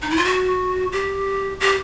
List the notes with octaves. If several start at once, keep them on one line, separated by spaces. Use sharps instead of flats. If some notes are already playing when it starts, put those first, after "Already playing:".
D#4
E4
F4
F#4
G4
G4